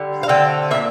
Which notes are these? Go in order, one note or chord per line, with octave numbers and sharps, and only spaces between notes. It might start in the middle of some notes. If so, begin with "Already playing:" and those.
Already playing: D3 G3
F5
D3 A3 C4 G5
A#2 F3 A#3 E5